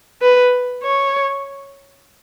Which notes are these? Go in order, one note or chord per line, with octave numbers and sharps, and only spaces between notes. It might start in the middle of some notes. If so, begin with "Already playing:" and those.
B4
C#5